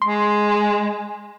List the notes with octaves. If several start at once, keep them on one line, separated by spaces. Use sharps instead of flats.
G#3 C6